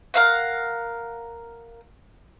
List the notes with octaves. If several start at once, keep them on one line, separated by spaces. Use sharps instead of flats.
A#4 F5 F#5